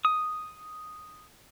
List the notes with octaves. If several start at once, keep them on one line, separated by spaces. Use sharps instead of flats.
D#6